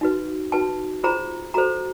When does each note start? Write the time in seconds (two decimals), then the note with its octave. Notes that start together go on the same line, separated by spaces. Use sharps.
0.01 D#4 F#4 B4
0.52 D#4 F#4 B4 A5
1.03 F4 G#4 C5 A#5
1.54 F#4 A4 C5 A#5